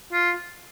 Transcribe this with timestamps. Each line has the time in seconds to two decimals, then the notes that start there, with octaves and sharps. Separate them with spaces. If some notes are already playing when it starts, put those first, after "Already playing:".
0.13 F4